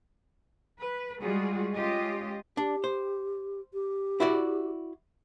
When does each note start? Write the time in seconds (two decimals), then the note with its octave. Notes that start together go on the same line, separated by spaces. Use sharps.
0.79 B4
1.20 G3 G#3 F4 F#4 G#4
1.73 G#3 C#4 F4 G4 D#5
2.57 D4 G4
2.84 C5
3.73 G4
4.20 E4 F#4 D5